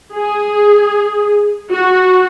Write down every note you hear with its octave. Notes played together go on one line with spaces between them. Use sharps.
G#4
F#4